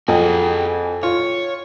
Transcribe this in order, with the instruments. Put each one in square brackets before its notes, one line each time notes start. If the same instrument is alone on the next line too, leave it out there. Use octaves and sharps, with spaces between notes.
[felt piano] F2 [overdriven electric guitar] F#4 G#4
[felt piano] F4 [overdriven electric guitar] C#5